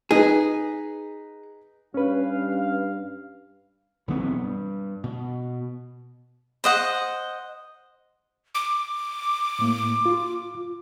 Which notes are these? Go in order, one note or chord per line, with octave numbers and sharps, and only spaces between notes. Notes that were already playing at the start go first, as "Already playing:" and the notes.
D#4 G#4 B4
G2 C#4 B4 F5
B1 E3 B3 C4
G2
B2
C5 D#5 F#5
D6
A2 A#3
F4